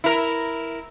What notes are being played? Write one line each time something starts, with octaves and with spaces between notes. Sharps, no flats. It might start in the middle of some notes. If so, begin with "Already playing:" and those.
E4 A#4